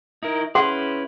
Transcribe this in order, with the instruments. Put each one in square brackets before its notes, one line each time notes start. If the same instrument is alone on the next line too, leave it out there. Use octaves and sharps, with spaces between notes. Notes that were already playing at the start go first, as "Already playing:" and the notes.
[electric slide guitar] D#4 E4 A#4
[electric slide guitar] C#4 E4 B4 [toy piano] G#4 F#5 C6